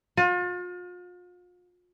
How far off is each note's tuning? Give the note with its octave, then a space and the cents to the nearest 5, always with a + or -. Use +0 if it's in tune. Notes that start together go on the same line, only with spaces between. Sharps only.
F4 +40